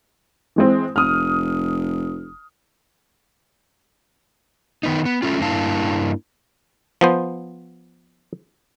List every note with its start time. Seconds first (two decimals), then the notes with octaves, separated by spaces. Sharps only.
0.56 E3 G#3 C4
0.96 F1 D#6 F6
4.83 D#3 B3 D#4
5.06 B3
5.22 A3 C#4 F4
5.41 G2 A#3 D4 E4 F5 A5
7.01 F3 B3 C5